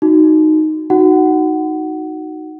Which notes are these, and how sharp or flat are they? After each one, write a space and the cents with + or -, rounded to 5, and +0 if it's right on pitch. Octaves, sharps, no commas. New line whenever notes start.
D#4 +0 F#4 +0
D#4 +0 F#4 +0 F#5 +15